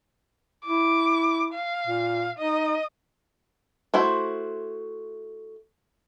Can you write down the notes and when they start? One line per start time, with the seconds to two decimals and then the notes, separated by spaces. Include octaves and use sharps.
0.66 E4 D6
1.54 F5
1.87 A#2
2.39 D#4 D#5
3.94 A3 E4 F#4 C5